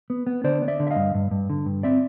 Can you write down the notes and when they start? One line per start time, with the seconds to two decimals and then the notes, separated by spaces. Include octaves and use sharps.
0.10 B3
0.27 B3
0.44 D3 C5 D5
0.62 B3
0.68 D5 E5
0.80 D3
0.87 E5
0.91 D#5 F5
0.96 G2
1.15 G2
1.31 G2
1.50 D3
1.66 G2
1.83 C4 D5 E5